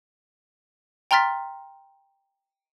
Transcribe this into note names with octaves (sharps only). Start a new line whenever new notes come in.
G5 A#5 C6 F6 A6 B6